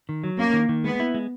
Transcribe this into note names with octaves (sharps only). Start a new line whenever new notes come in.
D#3
F#3
A#3 C#4
D#3
D#3
G#3 B3
E4
G#3